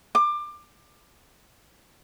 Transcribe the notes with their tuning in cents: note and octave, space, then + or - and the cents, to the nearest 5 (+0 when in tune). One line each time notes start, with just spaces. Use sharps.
D6 +25